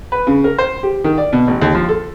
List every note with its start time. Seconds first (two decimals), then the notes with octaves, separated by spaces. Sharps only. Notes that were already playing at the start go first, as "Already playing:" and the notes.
0.12 B4
0.27 C#3
0.44 A#4
0.58 C5
0.83 G4
1.04 D#3
1.18 D5
1.33 B2
1.47 A1
1.62 D#2
1.75 F3
1.89 A4